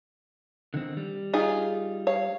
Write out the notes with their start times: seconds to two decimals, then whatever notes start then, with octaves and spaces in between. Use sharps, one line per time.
0.74 D3 D#3 C4
0.97 G3
1.33 D#4 F4 G#4
2.07 C#5 F5